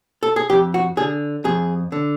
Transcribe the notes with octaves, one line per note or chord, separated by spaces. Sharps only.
A4
G#4
F2 G4
F#4
D3 G#4
F2 G#4
D3